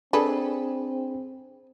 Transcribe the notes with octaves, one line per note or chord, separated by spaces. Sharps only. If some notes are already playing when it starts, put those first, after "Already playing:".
C4 D4 G#4 A4 B4